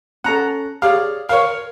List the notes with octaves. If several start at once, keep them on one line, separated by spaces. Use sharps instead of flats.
C#4 A4 F#5 A#5
G4 G#4 C#5 D5 F5
A#4 C5 C#5 F5